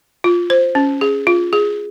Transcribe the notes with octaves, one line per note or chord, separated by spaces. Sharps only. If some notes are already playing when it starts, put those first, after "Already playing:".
F4
C5
C#4
G#4
F4
G#4